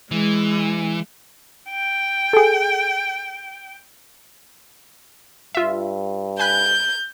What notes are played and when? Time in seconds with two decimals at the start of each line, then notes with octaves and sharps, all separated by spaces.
0.11 E3 G#3
1.70 G5
2.33 G#4 A4
5.55 G2 F4 E5
6.40 G#5 B5 F#6 G6